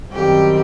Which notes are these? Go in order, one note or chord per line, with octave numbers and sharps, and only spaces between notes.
F#2 D#3 G3 C4 G4